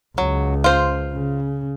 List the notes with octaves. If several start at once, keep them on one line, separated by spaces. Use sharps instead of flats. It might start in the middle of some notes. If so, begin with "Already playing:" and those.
C#2 F#3
F4 C5
C#3